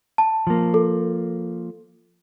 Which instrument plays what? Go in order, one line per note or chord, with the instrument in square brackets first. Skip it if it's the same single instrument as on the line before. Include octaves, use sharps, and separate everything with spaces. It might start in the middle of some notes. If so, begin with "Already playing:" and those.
[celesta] A5
[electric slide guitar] F3 A#3
[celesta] A4